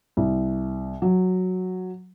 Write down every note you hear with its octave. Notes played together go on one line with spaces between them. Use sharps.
C2
F#3